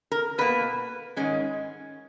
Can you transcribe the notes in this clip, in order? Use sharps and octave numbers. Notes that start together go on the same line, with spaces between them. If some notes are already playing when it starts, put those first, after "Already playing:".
A#4
B2 A#3 B4
G#2 D#3 G#3 C#4